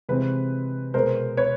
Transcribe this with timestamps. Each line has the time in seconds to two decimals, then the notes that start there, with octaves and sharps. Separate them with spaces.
0.09 C3 E3 G#3 C4 B4
0.94 B2 G#3 B3 A#4 C5
1.37 B4 C#5